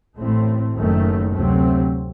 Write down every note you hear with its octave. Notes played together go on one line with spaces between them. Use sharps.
A1 A2 A3 C4
F#1 F#2 D#3 A3
D2 C3 F#3 A3 C4